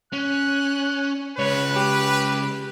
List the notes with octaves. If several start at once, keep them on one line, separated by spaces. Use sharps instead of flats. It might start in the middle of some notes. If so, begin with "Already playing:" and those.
C#4 F#6
C#3 G#3 B4 C#5
G4